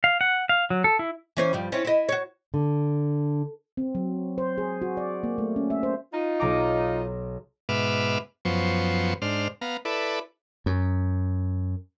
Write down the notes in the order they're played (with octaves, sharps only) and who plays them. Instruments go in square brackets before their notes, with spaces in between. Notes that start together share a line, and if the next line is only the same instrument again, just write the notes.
[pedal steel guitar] F5
F#5
F5
F#3
A4
E4
[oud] E3 C#4 C5
G2 F3 G3
C4 C#4 E4
E4 D#5
F#4 C#5
[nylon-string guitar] D3
[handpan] C4
F#3
C5
G#4
F#4
D5
A#3
A3
C#4
E5
C5
[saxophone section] D#4 F4
[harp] B1 A#5 D6
[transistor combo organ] G#2 B2 B4 E5 D6 F6
F#2 F3 B3 C5 C#6
G#2 D4 C5 F6
B3 F5 A#5
E4 A4 B4 D5
[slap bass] F#2